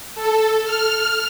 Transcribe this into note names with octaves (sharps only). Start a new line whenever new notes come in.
A4
F6